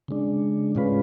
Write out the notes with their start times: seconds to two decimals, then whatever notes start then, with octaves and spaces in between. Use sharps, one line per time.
0.08 C#3 G#3 D4
0.75 A2 G#3 C#4 F4 B4